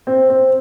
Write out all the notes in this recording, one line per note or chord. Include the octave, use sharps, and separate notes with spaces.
C4
C4